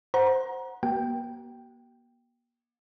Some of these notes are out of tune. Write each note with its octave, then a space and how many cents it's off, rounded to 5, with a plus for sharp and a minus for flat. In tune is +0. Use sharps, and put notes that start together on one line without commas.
C5 +0 F#5 +0 A#5 +30
A#3 +40 F#4 +45 G5 +0